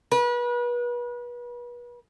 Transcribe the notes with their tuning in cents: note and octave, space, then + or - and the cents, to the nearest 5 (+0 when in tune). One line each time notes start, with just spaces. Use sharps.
B4 -35